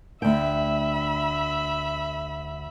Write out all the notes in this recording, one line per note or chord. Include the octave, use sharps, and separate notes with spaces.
D2 E5 G5 B5